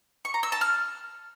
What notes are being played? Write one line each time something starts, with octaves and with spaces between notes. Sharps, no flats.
C#6
A#5
E6
A5
F6